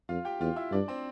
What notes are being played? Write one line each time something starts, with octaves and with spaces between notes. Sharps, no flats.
F2 F4 F5
G4 G5
E2 F4 F5
E4 E5
G2 D4 D5
C4 C5